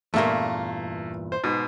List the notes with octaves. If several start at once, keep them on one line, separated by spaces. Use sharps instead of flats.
E2 G2 A#2 A3 A#3
C5
G#2 B2